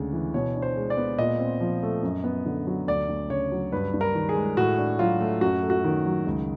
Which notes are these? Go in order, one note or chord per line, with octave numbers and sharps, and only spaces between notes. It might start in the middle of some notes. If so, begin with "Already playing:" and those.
Already playing: D2 C#3 G#3
E3
B2 C#5
D4
C5
G#3
D5
B3
A#2 D#5
C4
F3
A3
F#2
B3
D3
F#3
D2 D5
D2
C#3 C#5
F#3
G2 B4
G2
A#4
D#3
G#4
G#3
A2 F#4
D4
F#3 F4
A3
F#2 F#4
A3
F#4
D#3
F#3
C#2